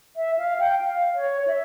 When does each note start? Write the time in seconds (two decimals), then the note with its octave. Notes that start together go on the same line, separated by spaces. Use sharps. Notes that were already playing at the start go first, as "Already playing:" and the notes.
0.16 E5
0.38 F5
0.60 G5
0.81 F5
1.15 C#5
1.47 E5